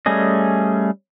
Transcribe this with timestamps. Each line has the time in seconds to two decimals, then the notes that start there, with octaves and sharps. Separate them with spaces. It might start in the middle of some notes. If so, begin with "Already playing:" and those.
0.06 G3 A3 C#4 G#4 D#5